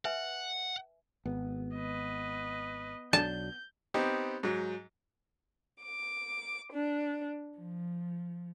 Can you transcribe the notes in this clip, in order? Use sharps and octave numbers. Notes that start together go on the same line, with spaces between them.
B4 E5 F#5 G#5
G#1 B3
B4 D#5
B1 F#3 D4 A5 G6
B3 C4 D#4 G4
G#2 F#3
D6
D4
F3